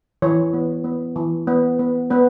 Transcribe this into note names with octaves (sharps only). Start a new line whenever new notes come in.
E3 C#5
B3
B3
E3
B3
B3
B3 B4